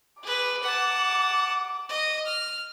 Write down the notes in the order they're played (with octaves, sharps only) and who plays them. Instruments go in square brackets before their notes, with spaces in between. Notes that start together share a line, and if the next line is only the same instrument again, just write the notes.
[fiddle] G#4 B4 [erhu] D6
[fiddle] F#5 A5
D#5
F6